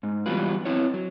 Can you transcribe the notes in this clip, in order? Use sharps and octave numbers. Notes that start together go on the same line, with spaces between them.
G#2
E3 F#3 G3 B3 F4 B4
C4 E4 C#5
F#3